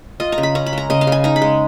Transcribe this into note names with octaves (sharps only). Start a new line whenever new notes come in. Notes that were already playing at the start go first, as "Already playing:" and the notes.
F4 D#5
A#5
C#3
B5
C#4 A#5
B5
G#3 A#5
C#3 D#5
F5
C#3 G#5
D#4 A#5
B5
G#3